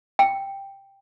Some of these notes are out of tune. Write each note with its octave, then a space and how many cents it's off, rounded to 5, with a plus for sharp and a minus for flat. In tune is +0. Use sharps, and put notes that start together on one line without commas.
G5 +5